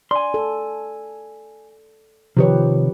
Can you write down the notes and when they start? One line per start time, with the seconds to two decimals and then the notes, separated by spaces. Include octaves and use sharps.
0.11 D5 G#5 C6
0.34 A4
2.37 C3 D#3 F3 G4 B4 C#5